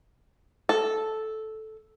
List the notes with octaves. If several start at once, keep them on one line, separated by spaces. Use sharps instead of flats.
A4